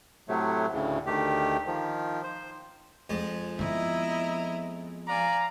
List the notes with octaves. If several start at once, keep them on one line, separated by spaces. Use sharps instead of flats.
A2 C3 F#3 A3
D2 A2 C#3
D2 D#3 A3 G4
D#3 F3
C5
F2 G#3
F3 B3 E4 D#5 A#5
D5 F5 G#5 A#5